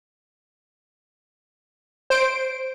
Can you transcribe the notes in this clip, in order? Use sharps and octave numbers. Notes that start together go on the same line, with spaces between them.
C5 D7